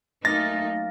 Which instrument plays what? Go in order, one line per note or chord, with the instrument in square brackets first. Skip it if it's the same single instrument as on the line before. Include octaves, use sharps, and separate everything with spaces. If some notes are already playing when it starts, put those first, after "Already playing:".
[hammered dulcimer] F#2 A#3 F5 [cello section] A3 D#4 [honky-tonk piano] A6 [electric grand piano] A#6